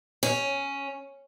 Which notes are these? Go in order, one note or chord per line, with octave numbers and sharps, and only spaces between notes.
C#4